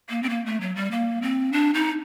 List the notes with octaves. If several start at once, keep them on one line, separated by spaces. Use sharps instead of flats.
A#3
C4
A#3
A3
F#3
G3
A#3
C4
D4
D#4